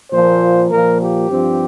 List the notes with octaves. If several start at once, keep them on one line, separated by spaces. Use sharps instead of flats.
A#2 F3 A#3 C5
A#2 F3 A#3 A#4
G4
G2 F3 C4